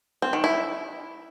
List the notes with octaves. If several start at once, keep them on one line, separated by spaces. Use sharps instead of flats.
C4
D#3
E4